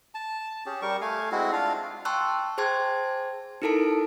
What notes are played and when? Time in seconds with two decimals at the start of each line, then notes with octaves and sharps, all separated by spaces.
0.14 A5
0.66 C#4 G4 G#4
0.82 G3 G4 A#4 C#6
1.01 A3 F5 G#5
1.32 G#3 C4 E4 F#4
1.52 D4 F4 F5
2.05 G5 A5 C6 C#6 E6 F#6
2.58 G#4 C5 G5 A5 C6 G#6
3.62 D#4 E4 A4 A#4 A5 D7